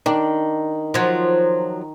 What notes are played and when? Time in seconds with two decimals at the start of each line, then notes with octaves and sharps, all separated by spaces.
0.06 D#3 D4
0.94 F3 F#3